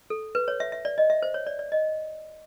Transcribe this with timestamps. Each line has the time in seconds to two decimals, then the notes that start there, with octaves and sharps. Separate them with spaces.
0.10 A4
0.35 B4
0.48 C#5
0.60 E5
0.72 E5
0.85 D5
0.98 D#5
1.10 E5
1.22 C5
1.34 C#5
1.47 D5
1.59 D5
1.72 D#5